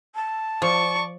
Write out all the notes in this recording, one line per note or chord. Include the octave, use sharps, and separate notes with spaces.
A5
F3 D5 C#6